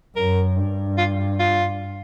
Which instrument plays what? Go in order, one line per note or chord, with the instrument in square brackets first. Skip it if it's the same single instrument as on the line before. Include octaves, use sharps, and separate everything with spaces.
[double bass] F#2 [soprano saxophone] A#4
[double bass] G2
[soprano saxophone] F4
F4